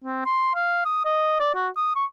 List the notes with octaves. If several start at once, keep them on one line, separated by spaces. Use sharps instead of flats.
C4
C6
F5
D#6
D#5
D5
F#4
D#6
C#6